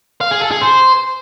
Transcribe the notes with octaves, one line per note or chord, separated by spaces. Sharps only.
F5
G#4
A4
G#4
C5